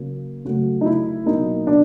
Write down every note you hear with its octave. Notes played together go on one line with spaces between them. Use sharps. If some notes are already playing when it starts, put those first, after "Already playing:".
Already playing: C#3 F#3 A#3
C#3 F#3 A3 F#4
D#4
E4
B2 F#3 A#3 D#4
D4